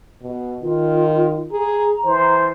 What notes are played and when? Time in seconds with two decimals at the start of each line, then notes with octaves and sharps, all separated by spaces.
0.22 B2
0.62 D#3 F4
1.51 G#4 A#5
2.06 E3 C5